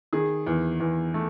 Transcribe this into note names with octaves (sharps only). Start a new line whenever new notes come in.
D#3 G#4
E2
E2
A3